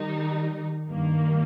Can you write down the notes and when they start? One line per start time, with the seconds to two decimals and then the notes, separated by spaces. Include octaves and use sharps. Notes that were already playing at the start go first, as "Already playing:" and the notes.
Already playing: D#3 G3 D#4
0.88 G2 D#3 A#3